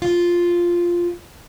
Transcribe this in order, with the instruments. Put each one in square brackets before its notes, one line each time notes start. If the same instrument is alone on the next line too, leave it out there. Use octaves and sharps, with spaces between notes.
[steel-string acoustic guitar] F4